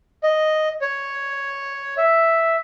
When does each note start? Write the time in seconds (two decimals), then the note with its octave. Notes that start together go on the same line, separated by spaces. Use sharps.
0.24 D#5
0.81 C#5
1.97 E5